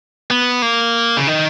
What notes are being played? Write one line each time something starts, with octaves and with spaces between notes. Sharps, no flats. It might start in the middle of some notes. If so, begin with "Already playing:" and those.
B3
A#3
C#3
D#3